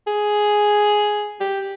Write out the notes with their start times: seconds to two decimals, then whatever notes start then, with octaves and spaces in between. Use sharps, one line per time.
0.07 G#4
1.40 G4